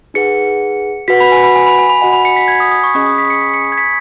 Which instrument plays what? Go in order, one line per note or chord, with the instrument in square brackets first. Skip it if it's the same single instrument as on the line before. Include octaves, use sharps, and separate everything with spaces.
[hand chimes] D#4 G#4 B4 F#5 [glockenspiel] C#7
[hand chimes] F#4 B4 F#5 [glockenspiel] B6
[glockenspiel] B5
G#5
B5
G#5
B5
G#5
B5
[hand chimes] F#4 D#5 F#5 [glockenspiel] G#5
[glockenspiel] B5
C#7
B6
G#6
D#6
D#6
C#6
[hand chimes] C#4 G#4 D#5 G#5 [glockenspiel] C#6
[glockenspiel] D#6
B6
C#7
B6
C#7
C#7
G#6
B6